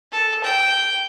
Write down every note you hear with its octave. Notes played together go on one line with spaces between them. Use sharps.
A4
G5